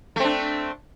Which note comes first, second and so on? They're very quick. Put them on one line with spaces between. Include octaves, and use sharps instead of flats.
A3 C4 D4